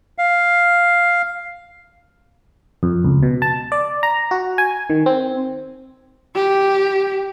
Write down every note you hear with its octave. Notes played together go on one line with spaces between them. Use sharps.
F5
F2
C#2
B2
A5
D5
A#5
F#4
G#5
D#3
C4
G4